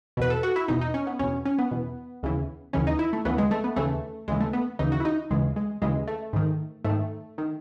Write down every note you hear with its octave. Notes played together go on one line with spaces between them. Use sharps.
E2 B2 B4
A4
F#4
E4
E2 B2 D#4
D#4
C#4
B3
E2 B2 C#4
C#4
B3
E2 B2
D#2 C#3 E3
D#2 C#3 E3 C#4
D#4
E4
A3
D#2 C#3 E3 B3
G#3
A3
B3
D#2 C#3 E3 A3
D#2 C#3 E3 G#3
A3
B3
D#2 C#3 E3 D#4
F#4
E4
D#4
D#2 C#3 E3 G#3
G#3
D#2 C#3 E3 G#3
A3
G#2 D#3
G#2 D#3 A3
D#3